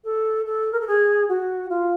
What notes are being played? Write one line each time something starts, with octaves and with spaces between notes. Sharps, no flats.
A4
A4
A#4
A4
G#4
F#4
F4